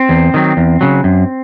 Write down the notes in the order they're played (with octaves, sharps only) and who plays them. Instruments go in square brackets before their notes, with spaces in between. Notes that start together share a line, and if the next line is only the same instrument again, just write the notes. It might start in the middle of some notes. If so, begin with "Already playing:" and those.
Already playing: [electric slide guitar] C4
E2
D#3 F#3
E2
C#3 F#3
F#2